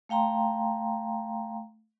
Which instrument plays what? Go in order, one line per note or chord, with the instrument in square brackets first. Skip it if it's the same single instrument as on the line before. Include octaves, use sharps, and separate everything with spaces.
[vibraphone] A3 F5 G5 A#5 C6